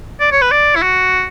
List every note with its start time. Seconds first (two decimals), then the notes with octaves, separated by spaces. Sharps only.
0.20 D5
0.32 C#5
0.41 B4
0.52 D5
0.76 E4
0.82 F#4